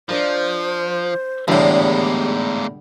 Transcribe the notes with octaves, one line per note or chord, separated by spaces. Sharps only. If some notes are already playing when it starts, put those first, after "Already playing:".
F3 D4 A#4 C5 D#5
E2 A2 D3 G3 G#3 A#3 G4